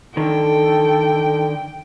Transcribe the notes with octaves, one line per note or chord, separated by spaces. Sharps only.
D3 D#3 A4 G5